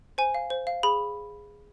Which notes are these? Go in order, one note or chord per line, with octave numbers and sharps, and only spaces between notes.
C5 G#5
F5
C5
F5
G#4 B5